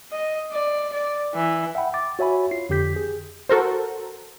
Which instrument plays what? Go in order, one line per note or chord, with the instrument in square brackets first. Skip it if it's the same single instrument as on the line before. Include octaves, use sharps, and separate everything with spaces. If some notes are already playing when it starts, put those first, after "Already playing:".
[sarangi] D#5
D5
D5
E3
[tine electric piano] E5 F#5 G5 B5
D6 A6
F#4 C#5 E5 G#5 B5
F4 C7
F2 D3 G4 G6 B6
G#4
[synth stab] F#4 A4 A#4 C5